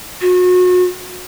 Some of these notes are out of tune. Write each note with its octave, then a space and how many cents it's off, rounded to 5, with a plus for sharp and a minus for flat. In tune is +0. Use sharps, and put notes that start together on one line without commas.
F#4 -35